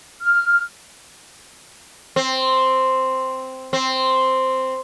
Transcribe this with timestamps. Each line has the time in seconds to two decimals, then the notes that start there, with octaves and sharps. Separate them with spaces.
0.21 F6
2.16 C4
3.73 C4